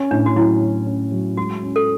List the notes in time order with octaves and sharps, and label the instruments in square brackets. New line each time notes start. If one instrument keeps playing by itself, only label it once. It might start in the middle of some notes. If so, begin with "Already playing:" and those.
Already playing: [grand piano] C#4
[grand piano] A2 [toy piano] D4
[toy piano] F#4
[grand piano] F#3 [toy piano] E4
[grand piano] F#3
C#4
F#3
[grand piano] G#3 [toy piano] F#4
[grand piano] C#4
[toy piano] A4